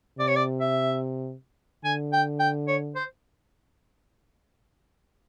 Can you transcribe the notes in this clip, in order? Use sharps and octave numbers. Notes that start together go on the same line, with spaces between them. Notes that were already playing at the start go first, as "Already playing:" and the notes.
C3 D5
C#5
D5
E5
D3 G#5
G5
G5
C#5
C5